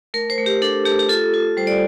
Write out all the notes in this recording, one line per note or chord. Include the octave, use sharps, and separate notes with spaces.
A3 A#4
C5
A3
G4
D4 A4
A3 G4
G4
F4 A4
F4
G3 C5
D5